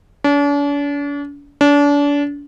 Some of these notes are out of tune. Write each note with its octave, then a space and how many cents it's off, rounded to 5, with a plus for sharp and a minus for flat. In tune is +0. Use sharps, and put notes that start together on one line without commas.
D4 -45
D4 -35